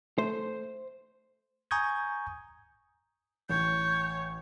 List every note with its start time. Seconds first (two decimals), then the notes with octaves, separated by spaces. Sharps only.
0.18 A3 C5
1.71 G#5 A#5 C#6 D#6 G6 G#6
3.50 A1 C#5 G6